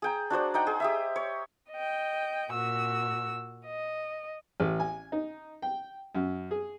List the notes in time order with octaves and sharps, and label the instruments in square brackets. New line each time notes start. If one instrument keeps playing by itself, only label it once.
[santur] G#4 G5 A#5
D4 F#4 C5 D5
D#4 F#5 G5
G#4
G4 D#5 E5
C#5
[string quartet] D#5 G5
A#2 F#4 E6
D#5
[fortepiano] A1
G#5
D#4
G5
F#2
G#4